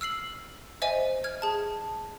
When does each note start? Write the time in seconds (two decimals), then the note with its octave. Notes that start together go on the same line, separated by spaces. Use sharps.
0.01 E6 F6 C7 F#7
0.82 C5 D#5 E5 G#5 D#7
1.24 F6 G#6
1.42 G#4 A5